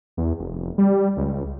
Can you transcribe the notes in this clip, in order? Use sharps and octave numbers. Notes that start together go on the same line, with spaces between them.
E2
F1
G3
C#2